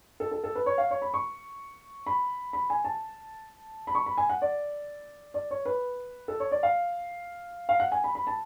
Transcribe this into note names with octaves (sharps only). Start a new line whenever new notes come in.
A4
A4
A4
B4
C#5
F5
C#5
B5
C#6
B5
B5
G#5
A5
B5
C#6
B5
G#5
F#5
D5
D5
C#5
B4
A4
C#5
D5
F5
F5
F#5
G#5
B5
B5
A5